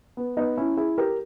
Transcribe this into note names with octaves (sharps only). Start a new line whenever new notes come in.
B3
B3 D#4
C#4 E4
E4 G#4
G4 A#4